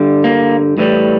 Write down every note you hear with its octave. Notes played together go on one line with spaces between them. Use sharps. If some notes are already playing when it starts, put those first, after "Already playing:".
Already playing: G2 D3 G3
A#3
A2 E3 G3